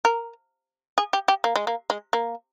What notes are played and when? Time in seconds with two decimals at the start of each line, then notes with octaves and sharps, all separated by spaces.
0.05 A#4
0.98 G#4
1.13 G4
1.28 G4
1.44 A#3
1.56 G#3
1.67 A#3
1.90 G#3
2.13 A#3